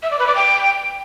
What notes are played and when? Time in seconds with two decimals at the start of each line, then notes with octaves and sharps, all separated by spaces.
0.03 E5
0.11 D5
0.19 B4
0.27 D5
0.35 G5